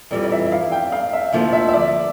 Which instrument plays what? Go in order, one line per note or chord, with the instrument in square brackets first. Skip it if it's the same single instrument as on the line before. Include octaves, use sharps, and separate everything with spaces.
[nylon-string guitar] F2 E3 G3 [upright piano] D5
[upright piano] D5
E5
F5
G5
F5
E5
[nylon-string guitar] D2 D3 F3 A#3 E4
[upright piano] E5
E5
D5